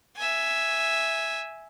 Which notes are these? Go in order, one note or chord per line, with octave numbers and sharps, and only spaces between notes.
E5 G#5